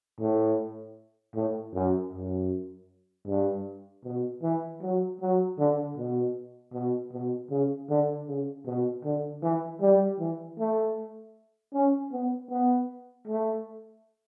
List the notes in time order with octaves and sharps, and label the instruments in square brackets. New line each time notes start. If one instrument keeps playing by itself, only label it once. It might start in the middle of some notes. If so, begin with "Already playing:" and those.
[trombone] A2
A2
F#2
F#2
G2
B2
E3
F#3
F#3
D3
B2
B2
B2
C#3
D3
C#3
B2
D3
E3
G3
E3
A3
C#4
B3
B3
A3